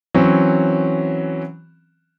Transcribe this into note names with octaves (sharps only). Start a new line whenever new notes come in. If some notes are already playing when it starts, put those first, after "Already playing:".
E3 F#3 C4 C#4